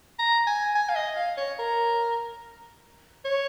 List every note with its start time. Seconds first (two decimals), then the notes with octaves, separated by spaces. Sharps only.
0.19 A#5
0.47 G#5
0.75 G#5
0.89 F5
0.95 D#5
1.16 F5
1.37 C#5
1.59 A#4
3.25 C#5